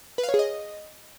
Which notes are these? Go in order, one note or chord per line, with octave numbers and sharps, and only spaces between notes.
B4
F5
C#5
G#4
D#5